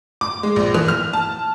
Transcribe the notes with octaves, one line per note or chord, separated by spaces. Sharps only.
D6
G#3
A#1
E3
F6
A5